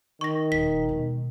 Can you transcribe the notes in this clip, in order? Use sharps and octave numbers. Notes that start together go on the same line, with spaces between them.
D#3 C#6 A#6
D#1 B6
B2 G#3